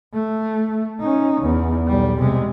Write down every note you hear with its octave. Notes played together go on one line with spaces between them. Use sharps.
A3
C#4 D#4
E2
B1 G3
C3 G#3